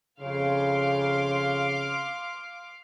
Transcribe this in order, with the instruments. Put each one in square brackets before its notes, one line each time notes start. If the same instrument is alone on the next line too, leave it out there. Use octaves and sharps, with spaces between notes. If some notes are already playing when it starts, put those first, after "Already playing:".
[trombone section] F2 C#3 [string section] F5 C6 D6